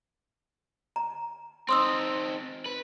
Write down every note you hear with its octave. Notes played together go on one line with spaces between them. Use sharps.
A#5
C4 D#4 C6 D#6 E6
B4